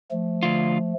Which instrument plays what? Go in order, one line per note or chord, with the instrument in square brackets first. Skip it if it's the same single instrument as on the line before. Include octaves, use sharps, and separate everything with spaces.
[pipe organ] F3 A3
[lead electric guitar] D2 F4